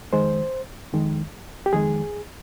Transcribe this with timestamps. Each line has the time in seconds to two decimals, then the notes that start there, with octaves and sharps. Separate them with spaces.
0.13 F2 D#3 G#3 C5
0.93 F2 D#3 G#3
1.66 G4
1.73 F2 D#3 G#3 G#4